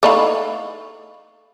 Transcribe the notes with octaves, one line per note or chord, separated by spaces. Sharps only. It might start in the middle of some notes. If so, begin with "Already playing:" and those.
A3 D#4 E4 F5 C#6